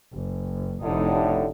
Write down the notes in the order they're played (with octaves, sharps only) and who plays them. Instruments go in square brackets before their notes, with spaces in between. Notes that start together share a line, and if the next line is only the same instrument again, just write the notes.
[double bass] F#1
[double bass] F1 D#4 [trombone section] A2 D3